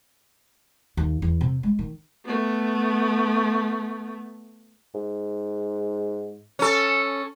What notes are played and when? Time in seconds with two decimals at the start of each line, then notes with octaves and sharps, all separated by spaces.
0.97 D#2
1.22 E2
1.41 C3
1.63 G#3
1.79 D#3
2.25 A3 B3
4.95 G#2
6.59 C#4 A4